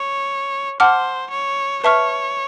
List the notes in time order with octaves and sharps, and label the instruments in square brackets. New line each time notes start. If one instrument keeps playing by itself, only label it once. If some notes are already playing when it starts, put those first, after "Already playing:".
Already playing: [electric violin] C#5
[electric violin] C5 [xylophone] F#5 A5 D6 F6
[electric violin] C#5
[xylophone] B4 E5 A5 C#6 F6 [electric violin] C#5